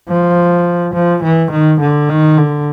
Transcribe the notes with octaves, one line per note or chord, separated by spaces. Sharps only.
F3
F3
E3
D#3
D3
D#3
D3